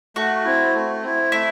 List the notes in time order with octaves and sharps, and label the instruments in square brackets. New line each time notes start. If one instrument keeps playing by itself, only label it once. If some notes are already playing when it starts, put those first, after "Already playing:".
[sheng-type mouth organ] A3 [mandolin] F#4
[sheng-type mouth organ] C4 E4
A3
C4 E4
[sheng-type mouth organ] A3 [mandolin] E4